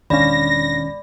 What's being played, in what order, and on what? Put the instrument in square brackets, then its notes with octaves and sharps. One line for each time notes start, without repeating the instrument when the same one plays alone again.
[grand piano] E1 D4 F5 [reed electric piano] D#3 C#4 [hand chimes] D5 B5 [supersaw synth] A#6